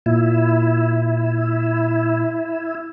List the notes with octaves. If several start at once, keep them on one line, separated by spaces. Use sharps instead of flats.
A#2 E4